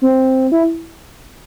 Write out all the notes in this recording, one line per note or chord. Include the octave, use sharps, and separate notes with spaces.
C4
E4